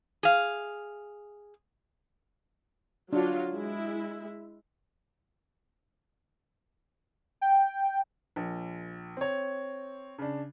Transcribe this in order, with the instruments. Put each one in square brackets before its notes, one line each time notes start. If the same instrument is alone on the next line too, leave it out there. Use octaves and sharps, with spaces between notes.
[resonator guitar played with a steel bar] G#4 F5
[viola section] F#3 F4 [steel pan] D4
[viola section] G#3 E4
[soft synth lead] G5
[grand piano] A#1
C4 C#5
C#3 D4